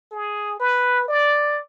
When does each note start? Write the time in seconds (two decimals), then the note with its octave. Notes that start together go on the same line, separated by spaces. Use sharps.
0.12 G#4
0.60 B4
1.08 D5